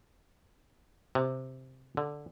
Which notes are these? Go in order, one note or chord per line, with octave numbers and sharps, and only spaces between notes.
C3
D3